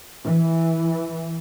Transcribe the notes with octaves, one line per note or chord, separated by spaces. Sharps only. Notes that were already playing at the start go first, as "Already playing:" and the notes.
E3